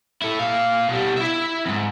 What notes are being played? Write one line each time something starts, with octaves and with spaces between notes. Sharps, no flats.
E4 A4
A#2 F5
B2 G3
E4 E5
E2 G#2